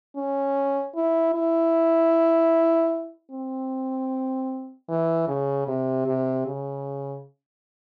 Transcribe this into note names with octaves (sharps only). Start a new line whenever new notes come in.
C#4
E4
E4
C4
E3
C#3
C3
C3
C#3